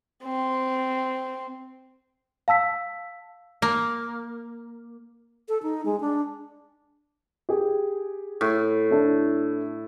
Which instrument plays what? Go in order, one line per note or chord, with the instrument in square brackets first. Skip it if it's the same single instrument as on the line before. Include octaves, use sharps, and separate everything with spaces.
[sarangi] C4
[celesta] F5 A5 E6 B6
[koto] A#3
[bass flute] A4
D#4
G#3
D4
[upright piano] G4 G#4
[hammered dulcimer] A2
[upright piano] D4 E4 A4